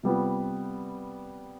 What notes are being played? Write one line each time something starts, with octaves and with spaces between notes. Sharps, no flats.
C3 G3 B3 F4